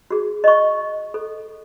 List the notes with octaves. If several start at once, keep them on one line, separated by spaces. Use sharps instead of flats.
F#4 G#4
D#5 C#6
A4